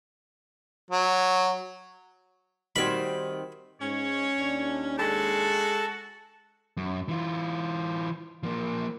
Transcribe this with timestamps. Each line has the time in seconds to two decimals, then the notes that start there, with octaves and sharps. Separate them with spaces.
0.90 F#3
2.76 D#3 G3 C4 F#4 B5 G#6
3.81 G#2 C#4 C#5
4.39 D#2 D4
4.99 G#3 F#4 A4 A5
6.77 F#2
7.09 E3 F4
8.43 F3 A#3